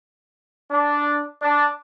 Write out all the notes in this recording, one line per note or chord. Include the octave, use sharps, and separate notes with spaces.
D4
D4